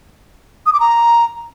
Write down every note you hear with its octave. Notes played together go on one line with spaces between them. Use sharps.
D#6
D6
A#5